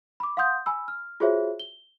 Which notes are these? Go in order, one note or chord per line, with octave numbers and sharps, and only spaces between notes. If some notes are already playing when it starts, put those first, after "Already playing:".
B5 D6
F5 F#5 C6 D#6 G6
G#5 B5 E6
F6
F4 F#4 G#4 C5 C#5 E5
G7